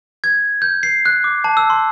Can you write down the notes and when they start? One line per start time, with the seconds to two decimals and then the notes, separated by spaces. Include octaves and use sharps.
0.24 G#6
0.62 G6
0.83 C7
1.06 F#6
1.24 D6
1.44 A5
1.57 E6
1.70 C6